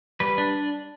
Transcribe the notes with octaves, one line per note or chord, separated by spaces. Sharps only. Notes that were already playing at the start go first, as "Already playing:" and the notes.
G3 B4
D4